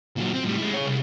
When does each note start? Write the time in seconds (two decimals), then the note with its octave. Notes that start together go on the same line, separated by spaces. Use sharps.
0.17 A#2 F#3
0.33 C4
0.45 A2 G3
0.57 G#3 E4
0.74 G#4 C#5
0.86 C2